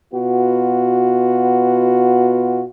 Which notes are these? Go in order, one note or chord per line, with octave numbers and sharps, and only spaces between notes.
B2 B3 F4 F#4